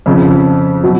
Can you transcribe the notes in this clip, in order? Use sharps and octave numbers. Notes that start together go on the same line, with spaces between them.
F2 C#3 F3
B2 F#3